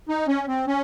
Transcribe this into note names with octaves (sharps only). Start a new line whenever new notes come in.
D#4
C#4
C4
C#4